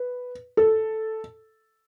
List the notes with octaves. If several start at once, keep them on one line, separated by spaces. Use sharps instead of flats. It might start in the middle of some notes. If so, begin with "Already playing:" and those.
Already playing: B4
A4